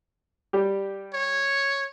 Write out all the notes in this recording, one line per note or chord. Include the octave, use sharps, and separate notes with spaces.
G3 G4
C#5